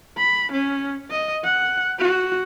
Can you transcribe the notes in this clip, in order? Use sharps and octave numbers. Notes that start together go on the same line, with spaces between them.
B5
C#4
D#5
F#5
F#4